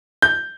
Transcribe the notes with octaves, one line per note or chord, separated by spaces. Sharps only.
G6